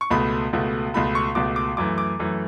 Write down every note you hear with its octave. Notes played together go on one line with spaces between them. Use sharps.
C#6
C#2 B2 A3 B5
C#2 B2 A3
C#2 B2 A3 B5
C#6
C#2 B2 A3 D6
D6
F#2 E3 A3 D6
D6
F#2 E3 A3